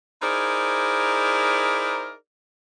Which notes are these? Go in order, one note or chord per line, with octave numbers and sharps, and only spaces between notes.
D#4 E4 G#4 A#4 C5 D5